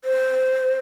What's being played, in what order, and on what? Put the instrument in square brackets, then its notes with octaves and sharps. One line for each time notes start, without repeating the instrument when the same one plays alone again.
[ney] C5